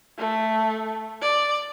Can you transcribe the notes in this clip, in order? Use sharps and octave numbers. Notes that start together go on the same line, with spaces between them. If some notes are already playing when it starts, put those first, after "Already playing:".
A3
D5